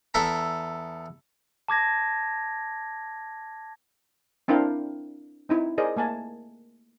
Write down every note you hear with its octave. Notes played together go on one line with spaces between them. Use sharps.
E2 A4 E5 A#5
A5 D6 G#6 A#6
C4 D4 E4 A#4 F5 G5
C4 D#4 E4
G#4 A#4 C5 D5 D#5
A3 A#3 G#5 A5